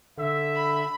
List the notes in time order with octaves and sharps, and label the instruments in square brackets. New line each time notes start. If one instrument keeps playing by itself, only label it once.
[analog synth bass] D3 [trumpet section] E5
[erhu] B5